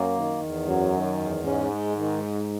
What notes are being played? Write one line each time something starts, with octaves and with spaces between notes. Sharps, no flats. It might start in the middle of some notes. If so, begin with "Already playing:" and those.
Already playing: F#2 A#3
D#3
E2
F#2 F#3
D#3
E2
G#2 C#4
G#3
D#3